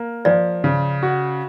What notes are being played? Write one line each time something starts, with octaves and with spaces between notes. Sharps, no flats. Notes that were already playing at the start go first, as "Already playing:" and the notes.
Already playing: A#3
F3 D5
C#3
F#4